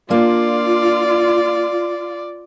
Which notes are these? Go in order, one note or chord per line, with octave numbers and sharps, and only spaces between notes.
A#3 D4 F4 D5